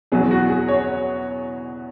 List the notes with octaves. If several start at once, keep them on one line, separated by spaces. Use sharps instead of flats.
E2 B2 F#3 B3 G#4
F#4
G#4
C#5